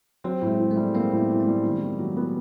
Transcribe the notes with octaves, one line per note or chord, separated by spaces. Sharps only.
F#3 C4
A2
G#3
E3
A3
G3
A#3 C4
A2
B3
E3
C4
G3
D#3
D#3
F#3
B3